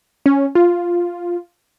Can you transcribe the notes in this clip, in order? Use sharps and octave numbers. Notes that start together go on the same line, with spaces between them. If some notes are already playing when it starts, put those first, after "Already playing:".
C#4
F4